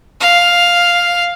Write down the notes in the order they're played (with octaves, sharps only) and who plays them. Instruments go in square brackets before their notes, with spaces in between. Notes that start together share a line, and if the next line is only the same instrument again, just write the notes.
[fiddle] F5